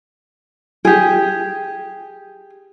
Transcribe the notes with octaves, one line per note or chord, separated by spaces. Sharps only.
G4 G#4